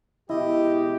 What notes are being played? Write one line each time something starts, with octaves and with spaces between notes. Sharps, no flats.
B2 G#3 E4 G4 D#5